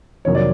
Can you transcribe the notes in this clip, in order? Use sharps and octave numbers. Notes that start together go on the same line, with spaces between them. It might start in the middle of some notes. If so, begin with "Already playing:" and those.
F2 C3 D#3 F#3 A#3 C#5
D5